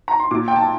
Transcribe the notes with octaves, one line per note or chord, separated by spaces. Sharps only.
A#5
C6
A#2 D6
G5
A5